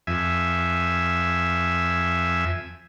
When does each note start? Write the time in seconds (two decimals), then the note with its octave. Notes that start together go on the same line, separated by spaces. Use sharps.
0.07 F2 E5 G#5